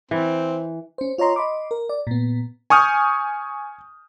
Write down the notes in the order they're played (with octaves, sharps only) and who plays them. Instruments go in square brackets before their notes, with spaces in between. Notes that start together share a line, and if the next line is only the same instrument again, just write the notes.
[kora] E3 [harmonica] C4
[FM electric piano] C#4 C5
F4 C#5 D#5 A#5 C6
D#5 B5 C6 D6
A#4
D5
A#2 B3
[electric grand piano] G#5 C#6 D#6 F6 G6